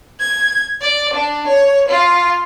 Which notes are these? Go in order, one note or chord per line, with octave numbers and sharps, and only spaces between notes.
G#6
D5
D4
C#5
F4